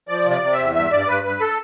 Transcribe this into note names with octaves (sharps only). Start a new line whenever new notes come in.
F3 D5
C3
D5
C3
E5
E2
G2 E5
G2 D5
G2 B4
G2 B4
A4